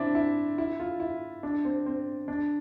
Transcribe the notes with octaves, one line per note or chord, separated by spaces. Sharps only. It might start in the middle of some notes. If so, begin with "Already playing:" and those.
Already playing: C4 D4 E4
E4
E4
F4
E4
D4
C4
C4
D4